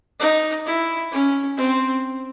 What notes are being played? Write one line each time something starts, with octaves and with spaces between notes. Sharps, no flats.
D#4
E4
C#4
C4